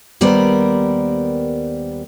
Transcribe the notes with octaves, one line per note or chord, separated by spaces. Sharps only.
D#2 G3 B3 A#4 C5 D5